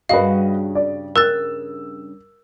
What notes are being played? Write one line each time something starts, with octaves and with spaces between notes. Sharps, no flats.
G2 C#3 F#4 B4 D#5 F5
D5
A#4 E6 F#6 A6